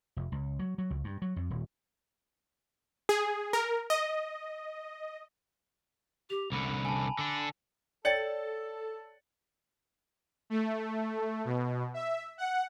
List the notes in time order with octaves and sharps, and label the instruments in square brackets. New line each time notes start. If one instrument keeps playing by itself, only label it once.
[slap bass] F1
C#2
F#3
F#3
C#2
G2
F#3
F2
D#1
[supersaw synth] G#4
A#4
D#5
[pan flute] G4 [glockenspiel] F7
[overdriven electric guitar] C2 D3 [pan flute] B5
[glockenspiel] G#5 A5
[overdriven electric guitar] D3 D4
[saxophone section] A4 [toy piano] C#5 D5 G5 [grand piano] A6 C#7 F#7
[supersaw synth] A3
B2
E5
F#5